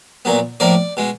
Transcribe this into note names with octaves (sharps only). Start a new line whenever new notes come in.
A#2 F#3 B3
A2 F3 A#3 D5
B2 G#3